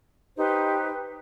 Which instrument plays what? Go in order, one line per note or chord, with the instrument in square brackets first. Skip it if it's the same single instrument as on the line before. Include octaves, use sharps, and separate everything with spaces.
[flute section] D#4 G4 B4 C5